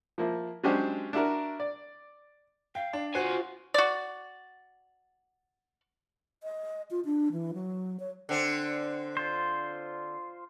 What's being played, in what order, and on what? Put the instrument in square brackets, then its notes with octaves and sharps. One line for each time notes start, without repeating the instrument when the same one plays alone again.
[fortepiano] F3 A#3 E4
F#3 G#3 C#4 D4 G4 C5
D4 E4 F#4 A#4
D5
[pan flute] F5 [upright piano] G5
[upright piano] D4
[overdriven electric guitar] F4 G#5 [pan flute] F#4 [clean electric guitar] C5 [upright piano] F#5
[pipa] F#4 D5
[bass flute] D#5
F4
D4
E3
F#3
C#5
[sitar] D3 C4
[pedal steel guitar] F4 C5